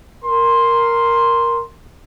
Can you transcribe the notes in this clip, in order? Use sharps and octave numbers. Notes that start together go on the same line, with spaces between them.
A#4 C6